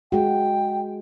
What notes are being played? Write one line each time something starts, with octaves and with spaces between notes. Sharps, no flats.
G#3 F#4 G5